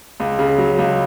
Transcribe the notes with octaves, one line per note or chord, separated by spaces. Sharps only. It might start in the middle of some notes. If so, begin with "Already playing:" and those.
C#2
C#3
F#3
C#2